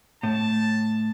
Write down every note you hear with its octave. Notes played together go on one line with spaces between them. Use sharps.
A2 A5